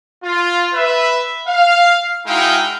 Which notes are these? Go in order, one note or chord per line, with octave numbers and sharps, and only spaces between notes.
F4
B4 E5
F5
G#3 D#4 E4 F#4 F5 G5